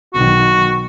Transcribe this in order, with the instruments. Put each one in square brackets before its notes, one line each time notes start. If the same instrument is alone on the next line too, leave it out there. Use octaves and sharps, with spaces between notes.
[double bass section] B1 B2 D#3 [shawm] F#4